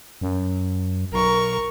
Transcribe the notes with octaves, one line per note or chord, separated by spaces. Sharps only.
F#2
B1 A#4 C#6